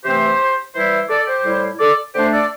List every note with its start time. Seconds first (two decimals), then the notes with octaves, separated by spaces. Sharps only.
0.04 C3 E3 A3 C4 G4 C5
0.75 E3 G3 E4 C5 E5
1.10 A4 D5
1.27 G4 C5
1.45 A2 G3 E4
1.80 A4 D5
2.14 D3 A3 D4 G4 C5
2.32 A4 D5